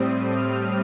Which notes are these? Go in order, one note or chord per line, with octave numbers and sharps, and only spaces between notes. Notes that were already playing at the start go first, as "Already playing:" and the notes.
Already playing: A2 G3 C4 D#6
F6